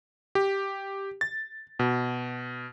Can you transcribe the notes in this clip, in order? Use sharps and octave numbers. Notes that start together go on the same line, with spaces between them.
G4
A6
B2